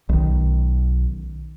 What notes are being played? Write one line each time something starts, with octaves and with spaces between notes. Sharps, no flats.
B1 D#3